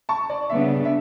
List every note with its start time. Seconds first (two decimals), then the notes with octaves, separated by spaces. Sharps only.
0.09 A5 C#6
0.30 D5
0.50 C#3 G3 B3 D4 E5
0.85 E5